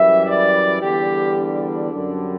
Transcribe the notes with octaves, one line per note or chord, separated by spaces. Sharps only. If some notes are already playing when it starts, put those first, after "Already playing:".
Already playing: F#2 E3 G3 E5
D5
E2 D3 G3 G4
D4
F#2 D3 G3